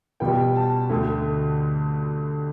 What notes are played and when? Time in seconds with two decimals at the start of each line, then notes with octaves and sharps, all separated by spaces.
0.20 B2 G3 B3 F4 G5
0.55 A5
0.89 D2 D3 A3